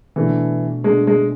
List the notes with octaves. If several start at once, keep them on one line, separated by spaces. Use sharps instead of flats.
B2 E3 A3 D4
B2 G#3 A3 D4
G#3